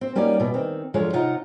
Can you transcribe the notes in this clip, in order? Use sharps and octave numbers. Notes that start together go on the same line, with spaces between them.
C4 C5
G3 A#3 C#4 D#4 F#4 D5
B2 E3
D#3 C4
F#2 D3 F3 G#3 F4 C#5
C3 D#4 F4 F#5 A#5